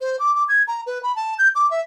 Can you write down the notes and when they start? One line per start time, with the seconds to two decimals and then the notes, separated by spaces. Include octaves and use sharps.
0.01 C5
0.20 D6
0.35 D6
0.49 G#6
0.67 A#5
0.87 B4
1.03 B5
1.16 A5
1.39 G6
1.55 D6
1.71 E5